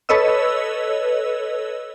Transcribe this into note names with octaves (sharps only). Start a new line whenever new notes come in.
A4 B4 C#5 D#5 E6